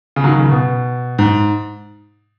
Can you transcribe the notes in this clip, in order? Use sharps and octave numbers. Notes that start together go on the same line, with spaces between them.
C#3
F#3
D#3
C#3
B2
G#2